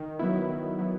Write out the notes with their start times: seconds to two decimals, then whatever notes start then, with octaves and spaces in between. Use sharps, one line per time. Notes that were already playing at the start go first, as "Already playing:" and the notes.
Already playing: D#3
0.19 F#3 B3 E4
0.49 D#3
0.79 F#3 B3 E4